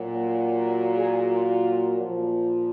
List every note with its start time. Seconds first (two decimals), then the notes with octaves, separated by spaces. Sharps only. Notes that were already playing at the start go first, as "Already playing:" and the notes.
Already playing: A#2 F#3
0.97 G#4
1.31 F4
1.99 A#2 F3